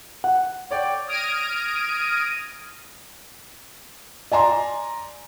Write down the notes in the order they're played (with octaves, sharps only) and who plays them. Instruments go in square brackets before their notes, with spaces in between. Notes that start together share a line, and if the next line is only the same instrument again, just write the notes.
[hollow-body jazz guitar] F#5
[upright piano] C#5 D5 G5
[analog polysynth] D#6 F6 G#6 A#6 D7 D#7
[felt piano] D5 G#5 A#5 C6